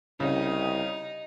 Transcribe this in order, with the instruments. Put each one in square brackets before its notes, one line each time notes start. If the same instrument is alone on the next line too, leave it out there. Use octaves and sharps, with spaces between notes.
[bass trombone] C2 [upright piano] C#3 [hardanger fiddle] D#4